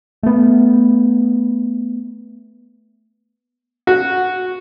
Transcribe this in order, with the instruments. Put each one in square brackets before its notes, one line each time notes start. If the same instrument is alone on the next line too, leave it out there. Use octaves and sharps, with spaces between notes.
[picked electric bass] A3 B3
[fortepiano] F#4